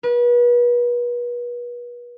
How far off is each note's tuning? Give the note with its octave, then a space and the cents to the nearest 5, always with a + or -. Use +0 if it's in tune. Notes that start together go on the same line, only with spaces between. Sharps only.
B4 -35